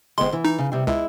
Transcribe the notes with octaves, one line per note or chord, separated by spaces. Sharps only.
G1 G#3 B3 C4 C6
E3
D#4
C#3
C3 G3
C#2 G#3 E4